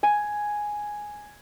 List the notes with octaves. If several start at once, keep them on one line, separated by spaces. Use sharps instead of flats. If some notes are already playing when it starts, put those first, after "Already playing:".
G#5